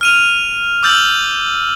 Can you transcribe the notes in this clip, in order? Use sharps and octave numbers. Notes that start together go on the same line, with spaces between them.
F6 D#7 F7
D6 E6 G6 A6 F#7